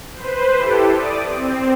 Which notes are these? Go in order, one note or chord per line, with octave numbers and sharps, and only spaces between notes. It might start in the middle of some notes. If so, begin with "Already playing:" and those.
B4 C5
E4 G4 A4
D5 D6 D#6
C4